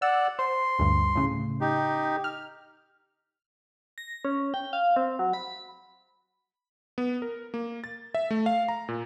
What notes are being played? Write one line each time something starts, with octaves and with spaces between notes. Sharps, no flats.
D5 F#5 E6
C5 C6
D2 G2
A2 C#3
D#4 G4
F6
A#6
C#4
G5
F5
C4
F#3
B5
B3
A#4
A#3
A6
E5
A3
F5
A#5
A#2